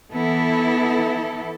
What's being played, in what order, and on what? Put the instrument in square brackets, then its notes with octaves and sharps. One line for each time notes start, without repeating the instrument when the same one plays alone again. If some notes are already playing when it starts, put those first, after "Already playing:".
[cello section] E3 B3 E4 A4